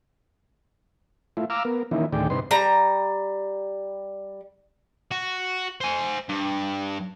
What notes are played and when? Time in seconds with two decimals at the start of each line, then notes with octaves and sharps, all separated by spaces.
1.37 A3 E4 F4
1.50 F5 A#5 D6 E6 F6
1.65 B3 A#4
1.91 D#3 E3 A#3 C#4 D#4 E4
2.13 D2 A2 D#3 G#4 D5 G5
2.30 G2 C3 D#4 B4 C6
2.51 G3 A#5
5.11 F#4
5.81 C5 G#5
6.29 G2